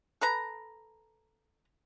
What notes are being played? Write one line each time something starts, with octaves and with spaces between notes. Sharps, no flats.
A4 B4 A#5